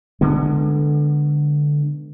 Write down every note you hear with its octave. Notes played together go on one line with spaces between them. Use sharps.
D3 G#3 B3